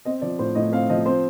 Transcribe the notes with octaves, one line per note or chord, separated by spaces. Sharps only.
C4 D#5
F3 D5
A2 C5
A2 D#5
C4 F5
F3 D#5
C4 C5